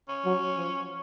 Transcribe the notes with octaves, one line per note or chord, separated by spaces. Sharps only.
C#4
F#3
F3